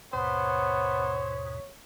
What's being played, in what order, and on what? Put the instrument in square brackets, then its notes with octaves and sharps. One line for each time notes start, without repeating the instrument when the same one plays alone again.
[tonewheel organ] D#2 G#2 B2 [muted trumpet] B3 [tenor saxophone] C5 [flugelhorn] C#5